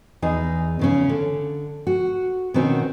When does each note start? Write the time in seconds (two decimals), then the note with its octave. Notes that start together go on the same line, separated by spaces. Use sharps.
0.22 E2 D#4 G#4
0.79 E2 C#3 C#4
1.09 D3
1.87 F#4
2.54 B2 D#3 C4 C#4 F#4